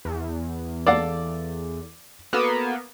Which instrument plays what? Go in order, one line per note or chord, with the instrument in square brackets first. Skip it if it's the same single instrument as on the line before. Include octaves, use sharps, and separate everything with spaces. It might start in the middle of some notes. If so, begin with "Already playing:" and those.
[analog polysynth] E2
[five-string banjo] A4 F5 F#5 [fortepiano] D5
[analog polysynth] A#3 B3 [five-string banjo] F#4 A4 B4